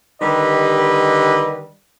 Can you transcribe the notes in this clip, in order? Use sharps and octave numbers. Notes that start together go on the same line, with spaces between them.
D3 D#3 G3 G4 B4 D#5